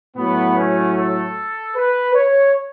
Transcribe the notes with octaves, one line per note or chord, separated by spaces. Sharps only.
A2 F#3 A3 B3
C#4
A4
B4
C#5